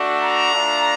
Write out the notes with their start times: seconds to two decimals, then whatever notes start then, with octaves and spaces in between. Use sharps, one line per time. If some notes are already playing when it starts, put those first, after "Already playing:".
Already playing: A3 D4 F#4
0.21 A#5
0.50 A3 D4 F4